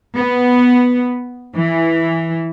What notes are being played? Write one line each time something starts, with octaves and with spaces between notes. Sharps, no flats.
B3
E3